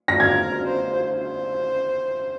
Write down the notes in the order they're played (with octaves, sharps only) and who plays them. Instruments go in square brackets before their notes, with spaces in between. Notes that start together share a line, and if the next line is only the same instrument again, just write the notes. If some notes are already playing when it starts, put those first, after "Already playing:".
[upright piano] A#6
[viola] A#4 [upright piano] G#6
[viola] C5
C5